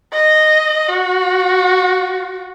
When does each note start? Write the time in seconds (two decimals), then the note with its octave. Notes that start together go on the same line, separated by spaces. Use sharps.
0.13 D#5
0.88 F#4